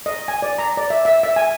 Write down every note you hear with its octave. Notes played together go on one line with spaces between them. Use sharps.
D#5
G#5
D5
A#5
D5
E5
E5
E5
G#5